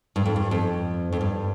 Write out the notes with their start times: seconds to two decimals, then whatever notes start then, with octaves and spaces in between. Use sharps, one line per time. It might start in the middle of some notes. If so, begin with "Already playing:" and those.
0.16 G2
0.26 F2
0.36 G2
0.51 F2
1.12 F2
1.21 G2